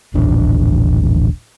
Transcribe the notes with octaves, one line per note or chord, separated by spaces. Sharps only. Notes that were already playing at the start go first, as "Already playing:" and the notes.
D#1 A1 D4